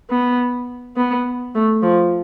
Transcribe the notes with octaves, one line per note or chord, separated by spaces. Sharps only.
B3
B3
A3
F3